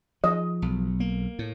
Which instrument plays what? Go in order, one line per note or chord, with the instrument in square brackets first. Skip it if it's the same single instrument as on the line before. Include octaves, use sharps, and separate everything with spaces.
[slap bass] F3 [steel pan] D#5
[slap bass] B1
A#3
A2